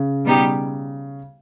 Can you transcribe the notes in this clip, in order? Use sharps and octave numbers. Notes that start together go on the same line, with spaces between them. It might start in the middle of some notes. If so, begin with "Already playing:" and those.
Already playing: C#3
B2 G3 B3 D#4 G4